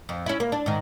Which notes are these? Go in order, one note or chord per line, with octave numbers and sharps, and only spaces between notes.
F2
C#4 E4
A#3
D4
G#2 D#3